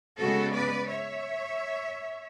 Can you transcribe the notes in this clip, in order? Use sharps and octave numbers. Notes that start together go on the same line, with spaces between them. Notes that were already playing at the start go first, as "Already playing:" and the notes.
C#3 G#3 B3 F#4 A4
B4 D5
C#5 E5